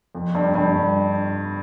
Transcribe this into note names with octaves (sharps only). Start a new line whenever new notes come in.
F2
G2
G2